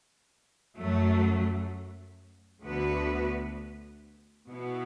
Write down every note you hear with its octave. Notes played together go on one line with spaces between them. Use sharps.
F#2 F#3 A3
D2 D3 B3 F#4 B4
B2 B3 E4